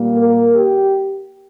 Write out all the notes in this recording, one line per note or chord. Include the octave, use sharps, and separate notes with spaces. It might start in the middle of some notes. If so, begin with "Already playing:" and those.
Already playing: A#2 G3 A#3
A#4
G4